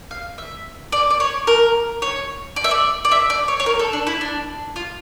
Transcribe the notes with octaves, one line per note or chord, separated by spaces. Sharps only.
F5
E5
D5
D5
C#5
A#4
C#5
D5
E5
D5
D5
E5
D5
C#5
C#5
A#4
A4
D4
E4
D4
F4